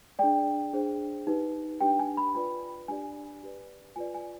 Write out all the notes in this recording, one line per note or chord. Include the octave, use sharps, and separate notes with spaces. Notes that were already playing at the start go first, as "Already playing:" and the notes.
D4 G#4 D5 G5
D4 G#4 C5
D#4 G4 B4
D4 G4 B4 G5
G#5
B5
F4 B4 D5 B5
D4 G4 D5 G#5
G4 B4 D5
F4 B4 D5 G#5
G#5